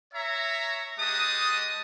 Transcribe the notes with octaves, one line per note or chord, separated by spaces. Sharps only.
C#5 E5 A#5
G#3 G4 D#5 F#5 A5 D#6